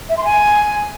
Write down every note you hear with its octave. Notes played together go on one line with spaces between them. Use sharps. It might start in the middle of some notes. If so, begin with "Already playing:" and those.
E5
C6
G#5